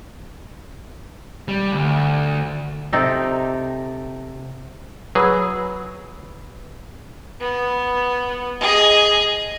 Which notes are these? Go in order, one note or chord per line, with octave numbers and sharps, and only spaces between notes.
G3
D2
C3 D#4 G4 A4
F#3 G#4 B4 B5 E6
B3
G#4 D#5